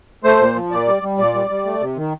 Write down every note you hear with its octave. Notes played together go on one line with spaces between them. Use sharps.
A3 C5
A#2
F3
A#2 D5
G3
G3
A#2 D5
G3
G3
A3
C3
D#3